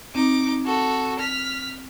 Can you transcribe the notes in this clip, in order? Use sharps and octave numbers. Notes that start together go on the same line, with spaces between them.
C4 D#4 D6
F#4 A4
F6 B6